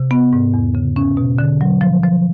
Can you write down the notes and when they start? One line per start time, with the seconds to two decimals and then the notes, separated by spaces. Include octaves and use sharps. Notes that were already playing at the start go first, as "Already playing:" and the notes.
Already playing: C3
0.11 B3
0.33 G#2
0.54 E2
0.75 C#3
0.96 C#4
1.17 B2
1.38 D3
1.61 F#3
1.81 F3
2.03 F3